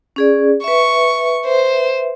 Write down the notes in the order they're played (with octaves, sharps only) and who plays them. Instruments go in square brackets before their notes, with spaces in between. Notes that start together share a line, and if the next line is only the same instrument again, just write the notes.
[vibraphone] C#4 G#4 D5
[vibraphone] B4 E5 [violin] C#6
[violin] C5